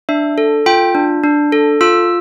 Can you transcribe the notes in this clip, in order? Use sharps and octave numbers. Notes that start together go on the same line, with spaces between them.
D4 E5
A4
F4 G5
D4
D4
A4
F4 E6